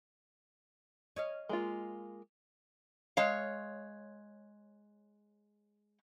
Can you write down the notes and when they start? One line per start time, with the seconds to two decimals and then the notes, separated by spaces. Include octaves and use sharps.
1.16 C#5 D#5 F5
1.49 G#3 A#3 F4
3.17 G#3 C#5 F5